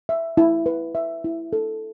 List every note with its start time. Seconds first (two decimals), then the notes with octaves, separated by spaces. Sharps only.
0.09 E5
0.37 E4
0.66 B4
0.95 E5
1.24 E4
1.53 A4